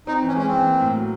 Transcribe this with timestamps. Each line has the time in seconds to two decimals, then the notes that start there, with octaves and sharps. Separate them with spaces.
0.07 C4 D#4
0.23 E3 C#4
0.36 G#3 C#4
0.47 C4
0.52 E3
0.67 A#3
0.81 A2
0.96 F#3